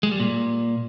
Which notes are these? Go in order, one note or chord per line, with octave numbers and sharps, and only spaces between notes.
G#3
G3
A#2